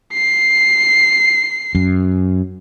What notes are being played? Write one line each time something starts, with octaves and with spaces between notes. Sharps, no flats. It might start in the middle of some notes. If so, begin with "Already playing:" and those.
C7
F#2